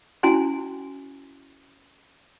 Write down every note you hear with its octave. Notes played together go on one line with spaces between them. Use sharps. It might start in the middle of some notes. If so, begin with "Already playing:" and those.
C#4 E4 F#4 G#5 C6